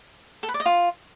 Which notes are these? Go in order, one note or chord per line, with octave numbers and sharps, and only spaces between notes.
A4
B4
D5
D#5
F4